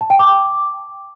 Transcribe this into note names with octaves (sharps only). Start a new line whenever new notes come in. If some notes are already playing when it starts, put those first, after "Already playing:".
A5
G5
D6